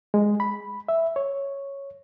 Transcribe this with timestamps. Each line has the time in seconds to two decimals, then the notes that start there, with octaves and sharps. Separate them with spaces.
0.14 G#3
0.40 B5
0.89 E5
1.16 C#5